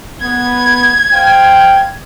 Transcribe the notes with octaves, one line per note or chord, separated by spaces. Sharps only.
B3 G#6
C5 F5 G5